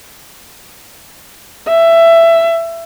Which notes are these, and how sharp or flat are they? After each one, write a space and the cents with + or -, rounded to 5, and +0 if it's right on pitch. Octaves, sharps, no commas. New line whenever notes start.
E5 +15